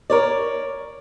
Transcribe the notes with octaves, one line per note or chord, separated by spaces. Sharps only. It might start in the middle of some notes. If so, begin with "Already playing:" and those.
A#4 C#5 D5